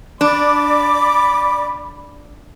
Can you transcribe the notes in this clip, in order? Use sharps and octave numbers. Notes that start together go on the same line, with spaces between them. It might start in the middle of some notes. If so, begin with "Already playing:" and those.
D4 D5 B5 D6